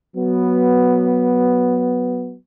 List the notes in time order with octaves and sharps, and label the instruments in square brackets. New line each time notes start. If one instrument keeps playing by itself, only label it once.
[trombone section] F#3 B3